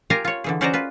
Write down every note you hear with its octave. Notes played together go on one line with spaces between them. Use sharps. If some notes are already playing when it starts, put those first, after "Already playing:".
F4 G4 A#4 F5 G#5 A#5
F4 C#5
D3 E3 G#4
C#4 F#4 C5 D5 D#5 A#5
F4 B4